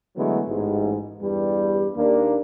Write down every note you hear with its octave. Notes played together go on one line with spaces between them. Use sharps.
D3 E3 F#3 G#3 A3 B3
A1 G#2
E2 G2 G3
D#2 A#3 D4